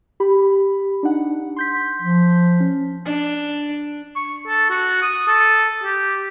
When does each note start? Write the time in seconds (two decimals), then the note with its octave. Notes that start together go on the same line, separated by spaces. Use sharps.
0.20 G4 B5
1.03 D4 D#4 F#5
1.56 C6 G6 B6
2.02 F3
2.60 C#4
3.05 D4
4.16 C#6
4.48 A4
4.70 F#4
5.02 D#6
5.27 A4
5.84 G4